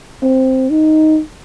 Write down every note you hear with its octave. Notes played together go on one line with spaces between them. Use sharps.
C4
D#4